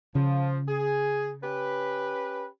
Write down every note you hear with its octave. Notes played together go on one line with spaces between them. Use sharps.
C#3 F3
G#4
C#4 G4 B4